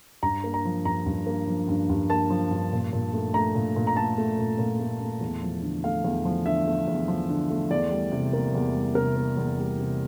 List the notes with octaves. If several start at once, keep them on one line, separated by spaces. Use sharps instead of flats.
G2 A#5
A#3
A#5
F3
G2 A#5
G2
A#3
F3
G2
G2
A#3 A5
F3
G2
A#2
A#2
A3
A3 A#5
A#2
A#2
A#5
A3 A5
A3
A#2
A#2
A3
A3
E2
F3
D3
A3 F5
E2
F3
D3 E5
A3
E2
F3
D3
A3
E2 D5
G3
C3
A#3
E2
G3
C3 A#4
A#3
E2
G3
C3